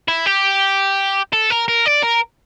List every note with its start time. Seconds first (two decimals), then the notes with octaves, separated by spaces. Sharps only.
0.08 E4
0.26 G4
1.33 A4
1.50 A#4
1.68 A#4
1.86 D5
2.03 A#4